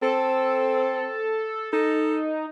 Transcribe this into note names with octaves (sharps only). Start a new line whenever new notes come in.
C4 A4
D#4 A4